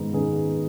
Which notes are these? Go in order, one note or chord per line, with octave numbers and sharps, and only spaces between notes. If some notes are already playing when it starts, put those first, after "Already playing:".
Already playing: G#2 D#3 B3
D#3 B3 G#4